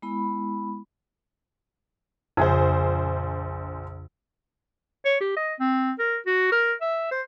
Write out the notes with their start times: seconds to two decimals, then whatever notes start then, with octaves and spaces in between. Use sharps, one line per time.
0.02 G#3 B3 E4 B5
2.37 A#1 F2 C#3 G#4 C5
5.05 C#5
5.21 G4
5.36 D#5
5.60 C4
5.99 A#4
6.26 F#4
6.52 A#4
6.81 E5
7.11 C5